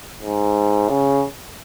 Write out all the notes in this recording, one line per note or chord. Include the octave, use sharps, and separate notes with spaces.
G#2
C#3